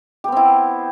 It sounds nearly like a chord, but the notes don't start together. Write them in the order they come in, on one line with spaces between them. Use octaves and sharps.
G4 B3 C4 E4